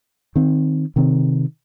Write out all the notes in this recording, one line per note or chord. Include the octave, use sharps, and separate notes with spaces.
D#3 C4
C3 D#3 C4